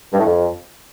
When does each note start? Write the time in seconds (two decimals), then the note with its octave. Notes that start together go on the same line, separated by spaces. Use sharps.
0.13 G2
0.20 A2
0.26 F2